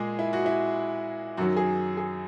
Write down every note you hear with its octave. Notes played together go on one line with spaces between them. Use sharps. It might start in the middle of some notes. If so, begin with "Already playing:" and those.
Already playing: A#2 G#3 G#4
E4
F#4
E4
F#2 D#3 F#3 F#4
G#4
G#4